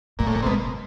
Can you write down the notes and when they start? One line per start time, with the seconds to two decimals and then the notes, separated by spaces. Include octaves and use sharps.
0.19 A#2 A3
0.27 A2
0.36 A#2
0.43 C3
0.46 B2 G#3